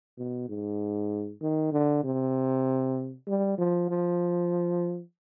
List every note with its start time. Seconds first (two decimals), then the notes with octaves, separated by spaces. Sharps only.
0.18 B2
0.49 G#2
1.42 D#3
1.73 D3
2.04 C3
3.28 G3
3.58 F3
3.90 F3